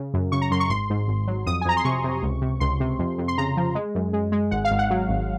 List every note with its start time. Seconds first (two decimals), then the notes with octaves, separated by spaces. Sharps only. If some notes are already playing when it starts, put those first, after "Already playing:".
Already playing: C#3
0.14 F#2
0.32 C#3 C#6
0.42 A#5
0.51 F#2 C6
0.60 C#6
0.70 G#1 C6
0.90 G#2
1.08 G#1
1.27 F#3
1.46 F2 D#6
1.61 G#5
1.65 F2 A#5
1.77 C6
1.85 C3 C#6
2.04 C3
2.23 C#2
2.42 C3
2.60 C#2 C6
2.80 C3
2.99 F2
3.18 F2
3.28 C6
3.38 C#3 A#5
3.57 F3
3.75 G#3
3.95 F#2
4.13 G#3
4.32 G#3
4.51 G#1 F#5
4.65 F5
4.71 G#1
4.79 F#5
4.90 F#3
5.09 G#1